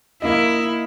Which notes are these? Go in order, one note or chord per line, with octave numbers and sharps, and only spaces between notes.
A#3 E4 D#5